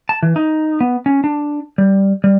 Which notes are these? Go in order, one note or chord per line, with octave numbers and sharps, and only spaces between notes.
A5
E3
D#4
B3
C#4
D4
G3
G3